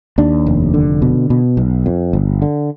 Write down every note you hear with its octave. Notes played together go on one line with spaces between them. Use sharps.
D#2 D4
F1
D3
B2
B2
B1
F2
G1
D3